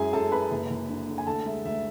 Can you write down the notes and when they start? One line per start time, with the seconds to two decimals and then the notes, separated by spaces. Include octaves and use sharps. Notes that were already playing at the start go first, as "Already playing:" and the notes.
Already playing: F#2 G#3 E4 G#4 G#5
0.13 F#2 A4 A5
0.31 F#2 B4 B5
0.51 F#1
0.70 F#1
0.89 D3
1.08 D3
1.18 G#5
1.27 D2 A4 A5
1.46 G#3 E5
1.65 D2 E5